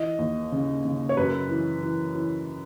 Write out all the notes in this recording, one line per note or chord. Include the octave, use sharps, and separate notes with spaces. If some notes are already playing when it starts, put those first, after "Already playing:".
Already playing: E3 D#5
D#2
C#3
C#3
C#5
F#2 B4
E3
E3
E3